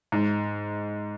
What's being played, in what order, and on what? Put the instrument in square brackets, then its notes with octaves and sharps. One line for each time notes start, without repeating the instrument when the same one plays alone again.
[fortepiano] G#2